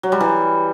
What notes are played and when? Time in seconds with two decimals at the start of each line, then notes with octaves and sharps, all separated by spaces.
0.03 F#3
0.12 G3
0.21 E3